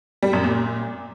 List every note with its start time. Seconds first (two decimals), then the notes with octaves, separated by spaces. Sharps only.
0.23 G3
0.33 F#2
0.44 A#2